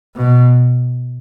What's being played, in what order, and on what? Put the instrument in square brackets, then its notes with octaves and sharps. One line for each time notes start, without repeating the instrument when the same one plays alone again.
[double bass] B2